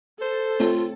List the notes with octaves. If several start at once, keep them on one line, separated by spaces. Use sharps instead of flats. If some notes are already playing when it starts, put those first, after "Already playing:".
A4 C5
A3 C4 F4 C#5